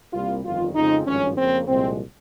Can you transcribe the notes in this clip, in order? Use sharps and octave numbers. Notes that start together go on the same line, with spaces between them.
C2 C3 G3 A#3 F4
G1 F2 D#3 G3 F4
F2 C#3 F3 G#3 C4 D#4
G#1 G2 F3 C#4
F2 C#3 F3 A#3 C4
C2 A#2 F3 G#3 C4